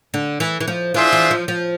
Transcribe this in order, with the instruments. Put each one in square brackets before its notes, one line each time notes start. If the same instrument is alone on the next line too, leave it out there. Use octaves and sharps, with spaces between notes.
[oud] D3
E3
E3
F3
[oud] E3 [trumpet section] D4 F4 G#4 C5 E5
[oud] E3
F3
F3